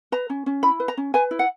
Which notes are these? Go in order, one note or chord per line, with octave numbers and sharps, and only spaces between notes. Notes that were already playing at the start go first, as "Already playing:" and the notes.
B4 A#5
C#4
C#4
E4 B5
B4
A#5
C#4
B4 G#5
E4
F#5